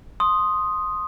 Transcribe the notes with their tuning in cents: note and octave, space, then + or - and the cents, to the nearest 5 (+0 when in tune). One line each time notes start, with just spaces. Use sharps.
C6 +10 D#6 +0